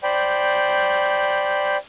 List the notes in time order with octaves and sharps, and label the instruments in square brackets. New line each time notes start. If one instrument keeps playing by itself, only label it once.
[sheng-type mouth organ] C5 D5 G5 B5